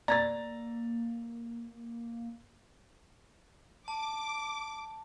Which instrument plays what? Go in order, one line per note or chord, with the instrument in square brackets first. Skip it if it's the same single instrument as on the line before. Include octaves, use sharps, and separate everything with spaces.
[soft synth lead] A#3 [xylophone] D5 G#6 [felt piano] A#5 A6
[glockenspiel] A5 [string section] D6